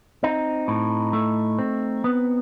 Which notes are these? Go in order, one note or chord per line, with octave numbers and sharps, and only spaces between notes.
C4 D#4
A2
A3
C4
B3